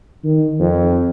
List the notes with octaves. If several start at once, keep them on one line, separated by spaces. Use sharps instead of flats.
D#3
F2